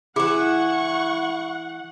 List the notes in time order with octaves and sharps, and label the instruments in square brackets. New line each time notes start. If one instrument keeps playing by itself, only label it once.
[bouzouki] E3 E4 [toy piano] G#4 [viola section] F#5 [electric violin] C#6